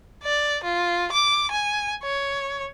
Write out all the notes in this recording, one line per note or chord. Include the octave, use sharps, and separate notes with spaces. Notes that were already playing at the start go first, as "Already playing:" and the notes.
D5
F4
D6
G#5
C#5